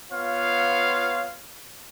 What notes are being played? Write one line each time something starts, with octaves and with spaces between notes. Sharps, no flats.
B3 F4 C#5 F5